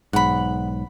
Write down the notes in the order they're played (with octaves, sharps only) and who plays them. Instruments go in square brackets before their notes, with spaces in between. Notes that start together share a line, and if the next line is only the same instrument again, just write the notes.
[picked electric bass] B1 G#2 [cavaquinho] F#5 B5